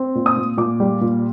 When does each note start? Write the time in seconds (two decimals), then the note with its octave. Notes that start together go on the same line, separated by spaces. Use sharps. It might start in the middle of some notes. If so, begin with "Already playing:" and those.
Already playing: C4
0.15 A#2
0.26 D#6
0.36 A#2
0.57 A#2 D6
0.80 G3
1.01 A#2